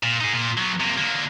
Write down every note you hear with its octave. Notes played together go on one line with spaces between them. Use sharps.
A#2
D#4 G#4
A#2
F#3 B3
C3 A#3
D3 A#3